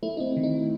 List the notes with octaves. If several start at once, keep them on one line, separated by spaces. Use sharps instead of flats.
A3 E4
C4 D#4
D#3
D#4